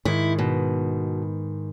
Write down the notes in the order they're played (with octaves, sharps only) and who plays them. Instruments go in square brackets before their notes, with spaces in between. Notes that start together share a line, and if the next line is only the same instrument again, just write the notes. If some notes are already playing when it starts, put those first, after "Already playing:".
[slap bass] G#2 D#3 [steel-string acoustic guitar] E4
[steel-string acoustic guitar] B2